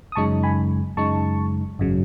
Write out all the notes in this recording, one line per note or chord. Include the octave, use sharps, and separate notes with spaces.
D#6
F#2 C#3 G#3 D#4 A5 C#6
G#5 B5
F#2 C#3 G#3 D#4 A5 C#6
G#1 F#2 C#3 F#3